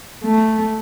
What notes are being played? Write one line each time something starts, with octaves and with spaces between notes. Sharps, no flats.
A3